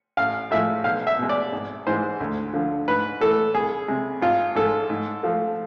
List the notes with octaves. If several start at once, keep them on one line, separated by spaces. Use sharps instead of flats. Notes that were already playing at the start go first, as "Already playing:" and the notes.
A1 F5
A2 F3 G#3 E5
B1 F5
E5
B2 G#3
D5
G#1
G#2 E3 G#3 C5
D2
D3 F3
G#2 B4
E3 A3 A4
C2 G#4
C3 G#3
G#1 F4
G#2 G#3 A4
G#2
F3 A3